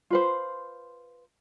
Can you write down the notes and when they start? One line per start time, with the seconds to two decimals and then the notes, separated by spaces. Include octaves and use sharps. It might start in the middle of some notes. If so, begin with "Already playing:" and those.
0.10 F4 B4 C5